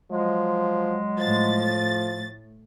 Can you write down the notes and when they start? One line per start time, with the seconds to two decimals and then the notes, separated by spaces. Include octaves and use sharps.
0.11 F3 F#3 G#3
1.19 A2 F3 A6